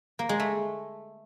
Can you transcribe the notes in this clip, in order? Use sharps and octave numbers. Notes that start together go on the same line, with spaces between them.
A#3
G#3
A3